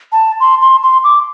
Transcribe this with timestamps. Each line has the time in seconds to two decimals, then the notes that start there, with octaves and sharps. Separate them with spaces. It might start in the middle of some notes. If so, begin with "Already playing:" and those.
0.12 A5
0.40 C6
0.61 C6
0.83 C6
1.04 D6